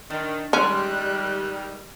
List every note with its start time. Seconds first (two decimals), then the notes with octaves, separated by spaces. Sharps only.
0.10 D#3 D4
0.53 D#3 G3 G#3 C#4 D5 F#6